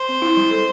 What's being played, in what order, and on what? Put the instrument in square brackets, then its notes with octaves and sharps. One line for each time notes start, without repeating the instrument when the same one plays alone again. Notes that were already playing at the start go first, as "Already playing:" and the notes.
Already playing: [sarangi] C5
[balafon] C4
E4
G3
A4